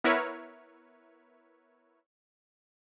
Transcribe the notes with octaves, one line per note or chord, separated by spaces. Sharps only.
B3 E4 A#4 B4 C#5 E5